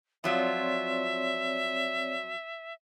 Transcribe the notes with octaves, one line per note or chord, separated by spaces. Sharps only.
F3 F#3 C4 F4 C#5 D5 E5